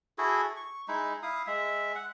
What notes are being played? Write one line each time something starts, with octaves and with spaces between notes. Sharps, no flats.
E4 F#4 G#4 A4
C#6
G#3 D#4 E4
E4 F5 D#6
G#3 E5
F#5